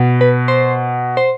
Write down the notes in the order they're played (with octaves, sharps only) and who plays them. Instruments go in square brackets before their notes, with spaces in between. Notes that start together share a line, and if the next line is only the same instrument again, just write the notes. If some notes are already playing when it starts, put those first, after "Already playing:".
Already playing: [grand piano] B2
[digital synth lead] B4
C5
C5